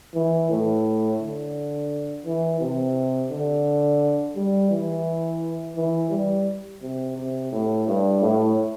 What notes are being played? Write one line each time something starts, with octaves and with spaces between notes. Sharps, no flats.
E3
A2
D3
E3
C3
D3
G3
E3
E3
G3
C3
C3
A2
G2
A2